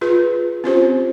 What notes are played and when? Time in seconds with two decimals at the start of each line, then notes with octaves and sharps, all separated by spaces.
0.01 F4 G#4 B4
0.64 C4 C#4 F4 G4 C5